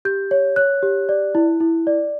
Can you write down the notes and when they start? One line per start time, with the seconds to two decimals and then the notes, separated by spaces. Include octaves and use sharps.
0.05 G4 G6
0.31 C#5
0.56 C#5 F#6
0.83 G4
1.09 D5
1.35 E4
1.60 E4
1.87 D5